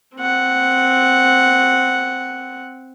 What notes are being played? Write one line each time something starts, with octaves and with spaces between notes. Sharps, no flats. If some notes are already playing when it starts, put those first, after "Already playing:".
C4 F#5